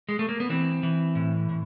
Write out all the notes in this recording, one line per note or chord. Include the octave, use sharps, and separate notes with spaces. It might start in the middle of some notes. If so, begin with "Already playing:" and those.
G#3
A3
A#3
B3
E3 C4
E3
A2
A2